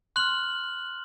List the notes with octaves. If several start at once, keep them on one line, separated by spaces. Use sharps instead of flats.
C6 F6 F#6 F#7